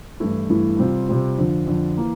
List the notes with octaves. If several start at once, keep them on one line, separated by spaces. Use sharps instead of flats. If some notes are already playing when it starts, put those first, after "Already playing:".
G2 E3 A3 E4
G2 E3 A3 E4
C3 G3 C4 F4
C3 G3 C4 F4
F2 D3 F3
F2 D3 F3
E3 A#3